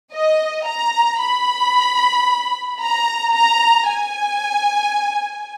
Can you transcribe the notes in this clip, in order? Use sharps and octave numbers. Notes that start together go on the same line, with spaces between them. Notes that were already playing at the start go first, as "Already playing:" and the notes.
D#5
A#5
B5
A#5
A#5
G#5